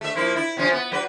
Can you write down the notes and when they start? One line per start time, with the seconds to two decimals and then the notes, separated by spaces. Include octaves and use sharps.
0.01 A3 E5
0.15 F3 A#3 E4
0.36 E4
0.57 C3 F3 C#4
0.73 B3
0.92 F#3 B4